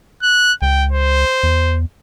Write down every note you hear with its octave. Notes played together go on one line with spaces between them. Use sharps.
F#6
C#2 G5
C5
E2